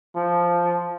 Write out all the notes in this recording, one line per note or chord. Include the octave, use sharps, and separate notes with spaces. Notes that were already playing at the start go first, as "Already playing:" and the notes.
F3